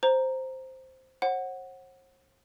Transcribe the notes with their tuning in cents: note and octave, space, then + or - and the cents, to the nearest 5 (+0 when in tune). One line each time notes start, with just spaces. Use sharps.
C5 +0 A#5 +0
C5 +45 F#5 +0